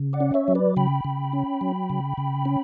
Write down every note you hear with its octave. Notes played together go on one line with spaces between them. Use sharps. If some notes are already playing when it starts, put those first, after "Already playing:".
Already playing: C#3
D5 F#5
C#4
C#5 E5
F#3
B4 D5
C#3 G5 B5
C#3
C#4
F#3
C#3
C#3
C#4